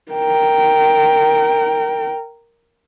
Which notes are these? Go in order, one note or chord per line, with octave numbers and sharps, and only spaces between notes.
A#4 G5